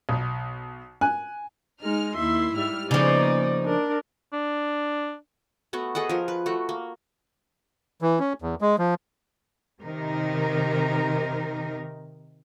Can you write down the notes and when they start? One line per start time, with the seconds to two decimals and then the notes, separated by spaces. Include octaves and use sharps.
0.09 B1
1.01 G#5 F#6
1.83 G#3 D#4 F6
2.16 D#2 E4 E5 C6
2.54 G#2 G3 F6
2.91 C#3 F3 A#3 B3 D#4 D5
3.65 D4 A#4
4.33 D4
5.73 A3 B3 F#4
5.95 G#4 A4 D#5 F#5
6.09 F3 A#4
6.28 B4
6.46 A3 F#4
6.69 A#3
8.02 E3
8.20 C#4
8.42 E2
8.61 G#3
8.78 F3
9.82 C3 D#3 D#4 A#4